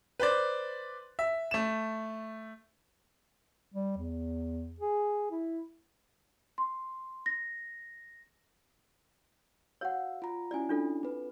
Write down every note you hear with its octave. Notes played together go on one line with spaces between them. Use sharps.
B4 C5 D5
E5
A3 E7
G3
E2
G#4
E4
C6
A#6
F#4 C#5 F5 F#5 E6
F4 A#5
C#4 E4 F#4 D5 G#5
D4 F4 A4
C4 B4